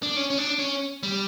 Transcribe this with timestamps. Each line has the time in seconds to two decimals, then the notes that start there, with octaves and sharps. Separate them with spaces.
0.03 D4
0.17 C#4
0.30 C#4
0.38 D4
0.59 C#4
1.03 G3